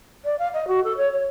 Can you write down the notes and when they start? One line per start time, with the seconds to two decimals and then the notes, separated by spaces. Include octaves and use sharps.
0.25 D5
0.39 F5
0.54 D#5
0.68 F#4
0.84 A4
0.97 C#5
1.12 C#5